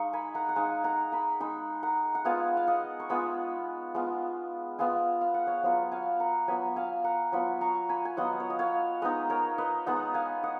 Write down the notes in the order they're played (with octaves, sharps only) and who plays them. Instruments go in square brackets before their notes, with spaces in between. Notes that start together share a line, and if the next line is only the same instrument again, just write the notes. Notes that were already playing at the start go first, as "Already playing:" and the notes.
Already playing: [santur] G#3 D#4 F5 C#6
G#5 B5
F#5 A#5
F#5
G#3 D#4 F5 G#5
F#5 A#5
G#5 B5
G#3 D#4 G#5 B5
F#5 A#5
F#5
G#3 B3 F4 F5 G#5
F5
D#5 F#5
C#6
G#3 B3 F4 G#5 B5
G#3 B3 F4
G#3 B3 F4 F5 G#5
F5
F#5
C#5 F5
F#3 B3 F4
F5 G#5
F#5 A#5
F#3 B3 F4 G#5 B5
F5 G#5
F#5 A#5
F#3 B3 F4 G#5 B5
A#5 C#6
G#5 B5
G#5
F#3 B3 F4 D#5 F#5
C#5
D#5
C#5 F5
G#3 B3 D#4 B4 D#5
A#4 C#5
B4 D#5
G#3 B3 D#4 D#5 F#5
F5 G#5
D#5 F#5